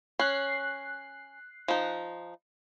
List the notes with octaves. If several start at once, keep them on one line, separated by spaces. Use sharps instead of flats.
C#4 F#6 C7
F3 D#4